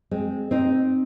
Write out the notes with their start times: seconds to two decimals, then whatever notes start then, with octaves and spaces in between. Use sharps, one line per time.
0.11 G#3 C4
0.51 C4 D#4